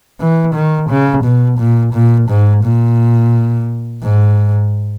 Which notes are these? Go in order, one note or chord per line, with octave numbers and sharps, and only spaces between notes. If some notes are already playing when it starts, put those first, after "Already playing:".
E3
D#3
C#3
B2
A#2
A#2
G#2
A#2
G#2